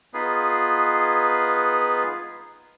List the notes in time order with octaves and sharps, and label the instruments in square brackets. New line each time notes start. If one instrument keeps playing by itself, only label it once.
[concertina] B3 D#4 F4 G#4 B4